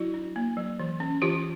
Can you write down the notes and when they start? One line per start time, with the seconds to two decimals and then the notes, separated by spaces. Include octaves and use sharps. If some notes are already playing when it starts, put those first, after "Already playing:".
Already playing: F#3 E4 F#4
0.14 D4
0.36 A#3
0.57 F#3
0.80 E3
1.00 C#4
1.22 E3 F4 G4